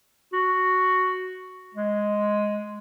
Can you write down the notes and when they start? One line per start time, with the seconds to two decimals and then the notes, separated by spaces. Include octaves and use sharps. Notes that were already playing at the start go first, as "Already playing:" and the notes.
0.33 F#4
1.74 G#3